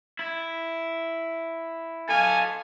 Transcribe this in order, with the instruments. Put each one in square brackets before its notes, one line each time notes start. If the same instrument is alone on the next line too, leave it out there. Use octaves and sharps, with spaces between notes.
[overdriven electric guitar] E4
[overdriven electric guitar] A4 F5 [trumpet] G#5